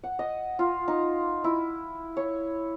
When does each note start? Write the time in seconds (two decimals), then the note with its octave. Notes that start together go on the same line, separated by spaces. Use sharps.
0.04 F#5
0.19 D#5
0.59 F4
0.88 D#4
1.44 E4
2.17 C#5